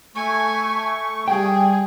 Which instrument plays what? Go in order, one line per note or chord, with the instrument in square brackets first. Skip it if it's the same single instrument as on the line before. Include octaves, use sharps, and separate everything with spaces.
[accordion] A3 C#6 [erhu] G#5
[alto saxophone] G3 [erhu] G#4 [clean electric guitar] G5